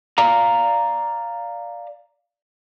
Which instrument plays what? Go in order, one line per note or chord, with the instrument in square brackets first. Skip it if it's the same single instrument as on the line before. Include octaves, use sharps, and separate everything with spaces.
[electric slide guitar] D5 F5 A#5